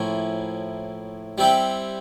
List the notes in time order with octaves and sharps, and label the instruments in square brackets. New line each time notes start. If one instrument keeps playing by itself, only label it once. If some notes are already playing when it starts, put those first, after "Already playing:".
Already playing: [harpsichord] A2 F3 A#3 C#4 E4
G3 C4 E4 G4